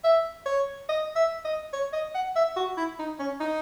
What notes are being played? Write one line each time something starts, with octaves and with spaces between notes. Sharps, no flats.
E5
C#5
D#5
E5
D#5
C#5
D#5
F#5
E5
F#4
E4
D#4
C#4
D#4